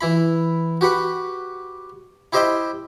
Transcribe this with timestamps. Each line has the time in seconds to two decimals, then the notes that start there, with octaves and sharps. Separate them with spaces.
0.01 E3 E4 B5
0.81 F#4 G4 B4 F#5
2.33 E4 G4 C5 D#5 E5 G5